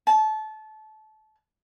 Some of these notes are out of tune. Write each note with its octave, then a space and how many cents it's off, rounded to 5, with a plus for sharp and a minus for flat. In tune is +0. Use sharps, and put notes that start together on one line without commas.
A5 -25